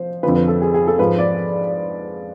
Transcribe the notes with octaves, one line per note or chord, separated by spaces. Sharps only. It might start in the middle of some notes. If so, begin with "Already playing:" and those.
Already playing: F3 C5
F2 D3 F3 B4
B4
A4
G#4
G#4
A4
G#2 F3 B4
D5